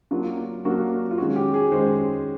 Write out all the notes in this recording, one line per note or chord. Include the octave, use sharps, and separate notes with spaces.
F#3 A#3 D4 F4
F#3 A#3 D4 F#4
F4
D#3 G#3 C#4 F#4
G4
G#4
D#3 G#3 C#4 C5